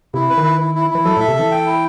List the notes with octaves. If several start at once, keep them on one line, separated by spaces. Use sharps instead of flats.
C3 E4
B4
D#3
E4
E4
E4
E3 E4
F#3 A4
A2
E5
C3
E3 A4
G5
E4